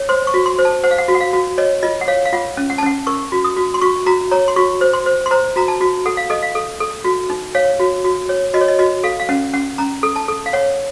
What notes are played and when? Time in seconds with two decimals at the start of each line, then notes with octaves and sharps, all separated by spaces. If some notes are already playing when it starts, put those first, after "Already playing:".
Already playing: C#5
0.09 C5 C6
0.27 C#6
0.34 F#4
0.46 C6
0.59 C5
0.65 A5
0.83 C5 F#5
0.91 F5
0.98 F#5
1.08 F#4
1.15 F#5
1.20 F5
1.33 F#4
1.58 C#5 D#5
1.83 F4 D#5
2.01 F#5
2.08 C#5 F5
2.25 F5
2.33 F4 F#5
2.57 C#4
2.70 F#5
2.78 A5
2.83 C#4 F#5
3.07 A#4 C#6
3.32 F#4
3.44 D#6
3.57 F#4
3.74 C6
3.81 F#4 C#6
4.06 F#4 A#5
4.31 C#5 A#5
4.48 C6
4.56 F#4 C#6
4.81 C5
4.93 C6
5.06 C5
5.26 C6
5.31 C5 A#5
5.56 F#4 A#5
5.68 A5
5.81 F#4
6.06 A4 F#5
6.17 F5
6.30 A4 D#5
6.42 F5
6.55 A4
6.80 A4
7.04 F#4
7.30 D#4
7.55 C#5 F5
7.80 F#4
8.04 F#4
8.29 C#5
8.54 F#4 D#5
8.61 C#5
8.68 D#5
8.79 F#4 D#5
9.03 A4 F5
9.20 F5
9.29 C#4 F#5
9.54 C#4 F#5
9.78 C#4 A#5
10.03 A4
10.16 A5
10.28 A4
10.46 F5
10.53 C#5 F#5